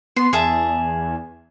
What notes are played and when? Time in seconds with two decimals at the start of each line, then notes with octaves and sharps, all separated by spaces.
0.16 B3 C6
0.33 E2 G#4 E5 A5